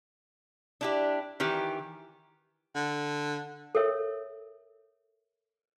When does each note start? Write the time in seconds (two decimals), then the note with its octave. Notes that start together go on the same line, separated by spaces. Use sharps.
0.81 D4 E4 G4
1.40 D#3 E3 G4
2.75 D3
3.75 A4 A#4 C#5 E5